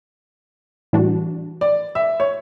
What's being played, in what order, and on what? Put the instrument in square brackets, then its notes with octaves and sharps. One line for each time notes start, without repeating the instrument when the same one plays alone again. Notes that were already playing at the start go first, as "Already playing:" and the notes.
[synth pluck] A2 E3 G3 D4 F#4
[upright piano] D5
E5
C#5